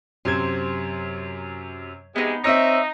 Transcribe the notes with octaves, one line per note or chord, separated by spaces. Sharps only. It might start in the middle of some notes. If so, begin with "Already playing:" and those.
F#2 C3 C5 G#6
C3 G#3 B3 D#4
C4 D#4 C#5 D#5 E5 E6 A#6